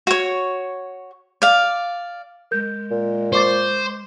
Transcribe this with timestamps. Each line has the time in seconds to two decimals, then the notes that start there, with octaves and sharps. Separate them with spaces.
0.07 F#4 C#5
1.42 D5 F5
2.51 G#3 A#4 G6
2.91 A#2
3.33 C5 C#6 D6 A6